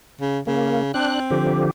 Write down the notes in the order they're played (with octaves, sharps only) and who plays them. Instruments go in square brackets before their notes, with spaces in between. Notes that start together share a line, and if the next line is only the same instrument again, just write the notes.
[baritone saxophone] C#3
[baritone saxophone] C#3 [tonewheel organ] A#3
[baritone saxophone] C4 [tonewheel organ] D4 F#6
[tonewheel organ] D3 F3 G4